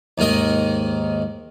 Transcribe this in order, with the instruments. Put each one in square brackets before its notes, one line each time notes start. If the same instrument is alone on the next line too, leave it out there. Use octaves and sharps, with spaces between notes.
[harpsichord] D#2 G#2 D#3 A#4 D#5